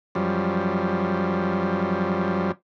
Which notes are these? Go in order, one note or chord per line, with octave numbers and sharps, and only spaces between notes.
F#2 F3 G3